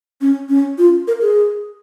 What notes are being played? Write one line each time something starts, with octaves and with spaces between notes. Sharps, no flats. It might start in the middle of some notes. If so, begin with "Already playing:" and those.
C#4
C#4
F4
A#4
G#4